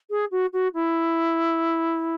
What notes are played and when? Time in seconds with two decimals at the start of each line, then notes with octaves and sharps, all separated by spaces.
0.10 G#4
0.31 F#4
0.53 F#4
0.74 E4